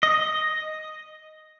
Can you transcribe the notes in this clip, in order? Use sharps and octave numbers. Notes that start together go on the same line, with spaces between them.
D#5